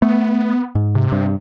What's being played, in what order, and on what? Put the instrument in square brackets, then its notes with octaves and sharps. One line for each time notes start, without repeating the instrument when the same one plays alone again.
[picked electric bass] A3 [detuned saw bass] B3
[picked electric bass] G#2
[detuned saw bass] C3
[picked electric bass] G2